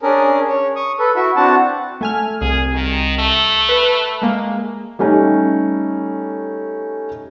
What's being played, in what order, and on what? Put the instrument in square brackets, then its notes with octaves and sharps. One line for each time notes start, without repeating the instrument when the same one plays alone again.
[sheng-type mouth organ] C#4 D4 G#4 A#4
C#5
C#6 D#6
A4 B4
E4 F#4 E5
C4 D4 F#4 F#5 A5
[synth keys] A3 G#5 F6
[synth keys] C2 [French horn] G#4
[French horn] D#3
A3
[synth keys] B4
G#3 A#3
[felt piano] G3 A3 C#4 D#4